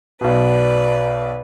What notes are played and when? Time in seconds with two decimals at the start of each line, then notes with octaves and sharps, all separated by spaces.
0.21 B1 B2 B4 D5